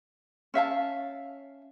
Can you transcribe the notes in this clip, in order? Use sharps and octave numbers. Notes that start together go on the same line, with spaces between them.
C#4 E5 F5 A5